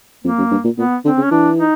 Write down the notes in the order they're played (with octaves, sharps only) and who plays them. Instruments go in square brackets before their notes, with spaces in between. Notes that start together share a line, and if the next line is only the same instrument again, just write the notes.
[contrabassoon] F2 [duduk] A#3
[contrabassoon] F#2
G2
A#2
[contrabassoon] A#2 [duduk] B3
[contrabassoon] D3 [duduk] C4
[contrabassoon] C#3
[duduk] C#4
[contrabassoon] E3 [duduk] D4
[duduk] D#4